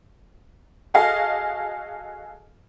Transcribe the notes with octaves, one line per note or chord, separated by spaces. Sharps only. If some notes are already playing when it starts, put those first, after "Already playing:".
F#4 G#4 A4 D#5 F5 G#5